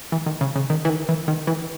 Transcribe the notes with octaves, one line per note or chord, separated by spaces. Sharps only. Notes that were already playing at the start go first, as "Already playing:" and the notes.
E3
D#3
C#3
C#3
D#3
E3
D#3
E3
D#3
E3